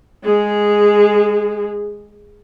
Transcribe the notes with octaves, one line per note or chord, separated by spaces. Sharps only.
G#3 G#4